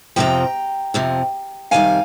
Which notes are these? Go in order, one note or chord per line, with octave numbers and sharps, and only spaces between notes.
F2 C3 F3 G5 A#5
F2 C3 F3
F2 C3 D#3 G3 F5 G#5